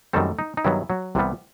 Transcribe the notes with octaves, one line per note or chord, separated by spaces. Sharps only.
F#2 D#3 G3 A3 C4 A4
D#4
D#4
G2 D#3 F#3 B3 E4
F#3 F#4
C2 C3 E3 G3 B3